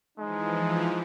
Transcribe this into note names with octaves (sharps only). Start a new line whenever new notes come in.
E3 F3 G#3 D#4